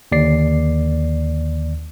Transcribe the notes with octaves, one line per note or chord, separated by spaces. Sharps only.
D#2 D3 D5 C7